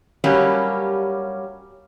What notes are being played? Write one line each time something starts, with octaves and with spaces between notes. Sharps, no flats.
G2 F#3 G3 A#3 C#4 G4